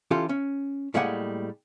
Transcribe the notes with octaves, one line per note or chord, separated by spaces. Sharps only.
E3 C#4 F4 G4 A4
C#4
A2 G3 G#3 A#3 F#5 G#5